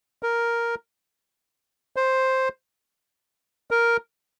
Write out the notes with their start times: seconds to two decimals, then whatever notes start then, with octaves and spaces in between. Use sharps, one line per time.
0.23 A#4
1.96 C5
3.71 A#4